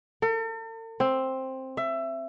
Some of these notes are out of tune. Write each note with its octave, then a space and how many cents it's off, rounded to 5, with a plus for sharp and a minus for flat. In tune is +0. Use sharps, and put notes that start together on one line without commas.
A4 +45
C4 +10
E5 +20